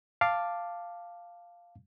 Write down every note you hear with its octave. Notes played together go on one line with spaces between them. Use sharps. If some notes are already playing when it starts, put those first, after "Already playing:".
F5 A5 D6